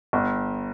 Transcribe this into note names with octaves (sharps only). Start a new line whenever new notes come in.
G1